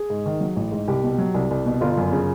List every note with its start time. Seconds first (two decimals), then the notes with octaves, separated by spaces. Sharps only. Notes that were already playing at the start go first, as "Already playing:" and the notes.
Already playing: G#4
0.10 G#2
0.26 D#3
0.41 F#3
0.56 A1
0.72 G#2
0.88 C2 G4
1.04 B2
1.18 F#3
1.34 C2
1.51 C2
1.66 B2
1.81 G1 F4
1.97 F#2
2.12 C#3